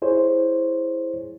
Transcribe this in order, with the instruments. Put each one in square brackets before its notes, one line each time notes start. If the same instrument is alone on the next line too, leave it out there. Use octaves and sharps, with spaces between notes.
[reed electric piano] E4 G#4 C5 C#5